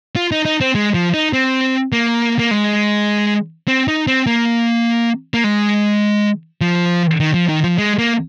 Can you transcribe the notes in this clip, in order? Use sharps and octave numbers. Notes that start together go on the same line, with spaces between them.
F4
D#4
D#4
C4
G#3
F3
D#4
C4
A#3
A#3
G#3
C4
D#4
C4
A#3
A#3
G#3
F3
D#3
F3
D#3
F3
G#3
A#3